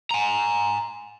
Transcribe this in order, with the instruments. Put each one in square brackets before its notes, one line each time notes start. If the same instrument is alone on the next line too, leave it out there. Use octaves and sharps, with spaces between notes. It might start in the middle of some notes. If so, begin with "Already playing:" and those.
[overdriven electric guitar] G#5 A#5